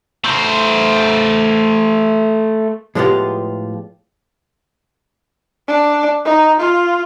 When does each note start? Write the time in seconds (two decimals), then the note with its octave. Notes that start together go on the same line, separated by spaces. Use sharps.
0.24 A3 C5
2.95 A2 F3 G#3 B3 F4 G4
5.68 D4
6.25 D#4
6.60 F4